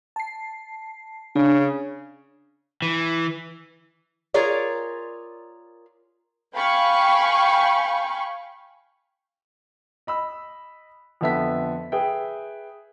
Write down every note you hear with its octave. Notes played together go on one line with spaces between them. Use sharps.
A5 C7
C#3 D4
E3
F4 G#4 A#4 C#5 D5
F5 G5 G#5 B5 C#6
D#5 B5 E6
F2 D3 B3 E5 A5 B6
G#4 B4 E5 G5